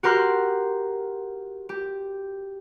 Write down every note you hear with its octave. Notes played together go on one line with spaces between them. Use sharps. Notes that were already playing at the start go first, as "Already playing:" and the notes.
F#4 G4 A#4 C6 F6 F#6
G4